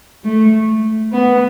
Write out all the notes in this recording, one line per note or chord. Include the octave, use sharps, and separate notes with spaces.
A3
B3